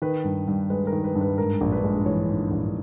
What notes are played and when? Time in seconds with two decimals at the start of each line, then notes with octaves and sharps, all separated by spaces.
0.02 D#3 B4
0.24 G2
0.47 G2
0.70 G#3 B4
0.87 A#4
0.93 D#3
1.04 B4
1.15 G2
1.21 B4
1.38 G#2 A#4
1.61 A#1
1.72 B4
1.83 G#3
2.06 E3 C#5
2.29 G#2
2.51 A#1